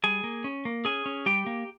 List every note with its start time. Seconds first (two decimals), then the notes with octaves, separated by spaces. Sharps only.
0.04 G3 G#4 G#5
0.24 A#3
0.44 C#4
0.65 A#3
0.85 C#4 G#4 G#5
1.06 C#4
1.26 G3 G4 G5
1.46 A#3